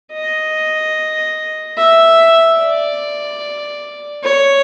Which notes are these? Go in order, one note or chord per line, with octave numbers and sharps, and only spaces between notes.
D#5
E5
D5
C#5